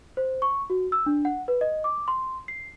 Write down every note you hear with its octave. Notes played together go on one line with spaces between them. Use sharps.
C5
C#6
F#4
E6
D4
F#5
B4
D#5
D6
C6
C7